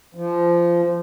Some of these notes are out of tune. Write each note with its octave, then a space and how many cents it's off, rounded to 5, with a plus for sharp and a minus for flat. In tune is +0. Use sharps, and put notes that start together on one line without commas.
F3 -20